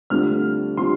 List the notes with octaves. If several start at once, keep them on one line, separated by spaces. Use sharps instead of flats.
D2 D3 G3 C4 F4 F6
D3 G3 C4 F4 C6